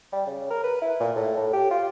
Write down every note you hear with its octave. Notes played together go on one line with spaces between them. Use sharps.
G3
C#3
A#4
B4
E4
A#2
A2
A2
G4
F4